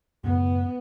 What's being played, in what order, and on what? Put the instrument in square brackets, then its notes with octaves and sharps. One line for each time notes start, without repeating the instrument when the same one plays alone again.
[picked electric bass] F#2 A2 C#3 [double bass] B3